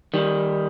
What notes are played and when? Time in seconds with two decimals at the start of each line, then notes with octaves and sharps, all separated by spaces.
0.14 D#3 G3